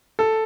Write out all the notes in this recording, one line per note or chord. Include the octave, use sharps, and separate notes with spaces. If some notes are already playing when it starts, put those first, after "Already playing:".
A4